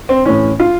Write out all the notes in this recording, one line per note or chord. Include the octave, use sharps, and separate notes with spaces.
C4
A2 E3 C#4
F4